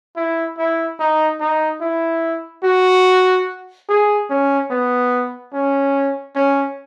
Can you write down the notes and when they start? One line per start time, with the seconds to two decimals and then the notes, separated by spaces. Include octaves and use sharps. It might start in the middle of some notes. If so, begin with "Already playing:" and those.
0.16 E4
0.58 E4
1.00 D#4
1.41 D#4
1.81 E4
2.64 F#4
3.89 G#4
4.30 C#4
4.71 B3
5.53 C#4
6.36 C#4